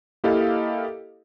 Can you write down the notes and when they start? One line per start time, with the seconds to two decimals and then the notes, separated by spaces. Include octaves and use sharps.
0.24 A#3 E4 G4 A4 D#5 F5